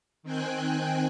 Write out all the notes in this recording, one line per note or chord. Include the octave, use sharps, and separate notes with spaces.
D#3 C4 G5 G#5 F#6